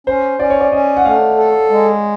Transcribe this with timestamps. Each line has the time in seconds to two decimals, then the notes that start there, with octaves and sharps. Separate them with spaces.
0.07 C#4 C5
0.39 C#4 D5
0.50 C#5
0.60 D5
0.72 C#4 D#5
0.96 F#5
1.05 A3 F5
1.37 A4
1.70 G#3